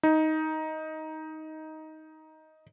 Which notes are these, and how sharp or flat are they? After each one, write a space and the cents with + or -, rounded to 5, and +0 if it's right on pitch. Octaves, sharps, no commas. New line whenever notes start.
D#4 +10